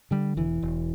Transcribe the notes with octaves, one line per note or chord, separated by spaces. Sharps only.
D3 G3
E1 E3
E1